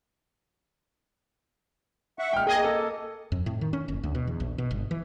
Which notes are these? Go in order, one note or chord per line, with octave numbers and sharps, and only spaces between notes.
E5 F#5 C#6
A#2 C#3 G#3 G5 F6
A#3 G#4 D#5 G5 G#6
A4
F2
A2
D#3
C#4
F#1
D2
B2
E2
A#1
B2
G1
E3